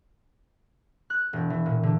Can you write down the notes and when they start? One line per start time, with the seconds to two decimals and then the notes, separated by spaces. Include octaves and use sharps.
1.10 F#6
1.33 E1
1.50 E3
1.66 A#2
1.83 D3